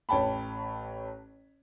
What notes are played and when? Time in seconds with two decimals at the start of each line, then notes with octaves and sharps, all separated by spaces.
0.09 A1 C#5 G5 A5 B5